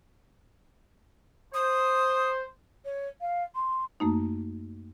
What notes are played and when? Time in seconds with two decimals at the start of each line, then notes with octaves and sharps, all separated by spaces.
1.54 C5 D#6
2.85 C#5
3.21 F5
3.55 C6
4.00 F#2 A3 A#3 D#4